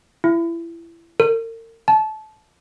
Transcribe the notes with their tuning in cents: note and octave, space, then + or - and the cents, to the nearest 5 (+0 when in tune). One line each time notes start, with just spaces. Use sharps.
E4 +25
A#4 -40
A5 -25